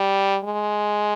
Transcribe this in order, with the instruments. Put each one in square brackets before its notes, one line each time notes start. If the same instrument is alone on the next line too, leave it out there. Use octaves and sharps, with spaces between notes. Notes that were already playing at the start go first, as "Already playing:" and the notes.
Already playing: [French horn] G3
G#3